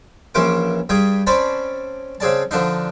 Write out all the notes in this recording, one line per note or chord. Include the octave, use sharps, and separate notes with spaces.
A#1 E3 A#3 C#4 C5 D6
G2 G3 G#4 G5 D#6
C4 C#4 C5 D5 A5 B5
C#3 C4 G#4 D5 A5
D3 F3 D4 D#4